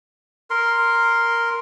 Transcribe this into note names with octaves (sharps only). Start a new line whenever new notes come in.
A#4 C6